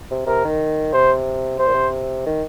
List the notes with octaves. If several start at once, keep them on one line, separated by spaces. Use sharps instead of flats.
C3
C3 A#4
D#3
C3 C5
C3 C5
A#2
C3
D#3